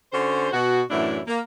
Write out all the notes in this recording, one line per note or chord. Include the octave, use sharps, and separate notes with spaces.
D3 C#4 F#4 C5
B2 F#4
F#2 A2 E3 F#3 D4 E4
A#3